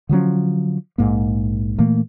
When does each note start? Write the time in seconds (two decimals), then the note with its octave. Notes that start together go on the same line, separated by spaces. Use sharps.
0.09 D3 F3 F#3 C#4
0.98 A#1 G#2 A#3
1.78 A#2 E3 A3 A#3